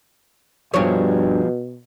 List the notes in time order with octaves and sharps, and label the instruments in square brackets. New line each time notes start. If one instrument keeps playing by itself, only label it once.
[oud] G2 C#5 [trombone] B2 [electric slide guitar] F3 G#4